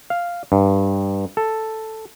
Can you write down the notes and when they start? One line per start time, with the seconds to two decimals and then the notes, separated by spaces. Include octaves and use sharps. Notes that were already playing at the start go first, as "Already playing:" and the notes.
0.10 F5
0.52 G2
1.37 A4